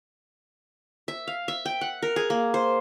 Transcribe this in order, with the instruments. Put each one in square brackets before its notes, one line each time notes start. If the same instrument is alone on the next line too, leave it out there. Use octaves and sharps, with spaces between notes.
[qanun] E5
F5
E5
G5
F#5
A#4
G#4
A#3
C5